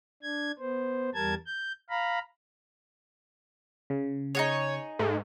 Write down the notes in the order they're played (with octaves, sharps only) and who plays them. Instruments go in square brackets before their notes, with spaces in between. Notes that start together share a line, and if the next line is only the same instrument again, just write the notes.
[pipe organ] D4 G#6
B3 C5
E2 G3 A#4 A5 G#6
G6
F5 A#5 B5
[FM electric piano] C#3
[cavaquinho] D#4 F#4 G#4 [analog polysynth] C#5
[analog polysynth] G#2 [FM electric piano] A3